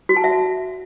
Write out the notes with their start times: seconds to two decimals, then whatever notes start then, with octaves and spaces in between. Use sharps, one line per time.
0.09 F#4
0.17 A5
0.24 E5